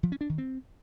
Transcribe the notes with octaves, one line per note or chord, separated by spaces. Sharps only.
F3
C#4
D4
D#3
C4